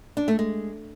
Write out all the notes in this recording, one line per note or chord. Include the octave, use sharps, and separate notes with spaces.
D4
A3
G#3